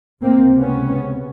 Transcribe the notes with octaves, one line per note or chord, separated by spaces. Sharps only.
C#2 C3 A#3 C4
B3 C#4